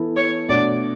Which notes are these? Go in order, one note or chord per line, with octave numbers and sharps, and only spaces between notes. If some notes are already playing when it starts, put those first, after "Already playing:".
Already playing: E3 B3 E4 A4
C#5
B2 A3 D4 F#4 C#5 D5